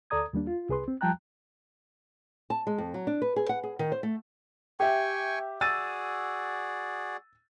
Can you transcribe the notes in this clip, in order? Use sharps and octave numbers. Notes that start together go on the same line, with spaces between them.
D2 A4 D5 A#5 D#6 G#6
D#2 G3 A#3 D4
F4
C2 G#4 B4 C6
C4
F3 G3 G5 A5 A#5 F#6
A5
G#3
F2
F#3
D4
B4
G#4
F#5
G#4
D#3
C5
A3
G4 E5 G5 G#5 C#6
F#4 G#4 D5 E6 A6 D#7